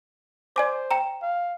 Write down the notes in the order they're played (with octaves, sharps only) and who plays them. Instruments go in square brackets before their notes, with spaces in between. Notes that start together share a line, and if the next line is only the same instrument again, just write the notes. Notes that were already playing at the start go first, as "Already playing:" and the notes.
[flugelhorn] C5 [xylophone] D5 G#5 D6
[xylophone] G5 A#5
[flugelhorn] F5